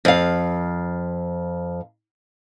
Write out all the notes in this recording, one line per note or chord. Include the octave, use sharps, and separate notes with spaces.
F2 F5